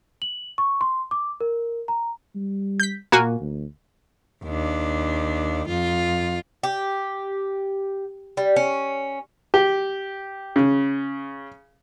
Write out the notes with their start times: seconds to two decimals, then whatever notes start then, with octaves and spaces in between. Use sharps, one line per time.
0.22 F#7
0.58 C#6
0.81 C6
1.11 D6
1.41 A#4
1.88 A#5
2.35 G3
2.80 G6 B6
3.12 A#2 A#3 F#4 G#5
3.40 D2
4.45 D#2 D4
5.68 F2 F4
6.63 G4
8.37 G3
8.56 C#4
9.54 G4
10.56 C#3